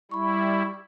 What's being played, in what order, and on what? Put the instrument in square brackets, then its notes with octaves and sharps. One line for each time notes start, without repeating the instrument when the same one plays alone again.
[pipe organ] G3 E4 [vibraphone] B5 C#6